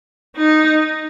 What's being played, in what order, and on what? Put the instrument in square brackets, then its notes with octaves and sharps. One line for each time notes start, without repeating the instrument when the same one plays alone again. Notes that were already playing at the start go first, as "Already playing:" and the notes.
[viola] D#4